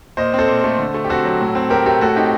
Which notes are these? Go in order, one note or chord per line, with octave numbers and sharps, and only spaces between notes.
A#2 C5 D#5
C4
A4 C5
A#2
A3
D3
A3
G4
C4 F#4 A4
F#3
A2
C4
A2 G4 A#4
A3 G4 A#4
A2 F#4 A4
C4 D#4 G4